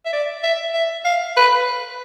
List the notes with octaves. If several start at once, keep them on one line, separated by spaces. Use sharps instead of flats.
E5
D5
E5
E5
F5
B4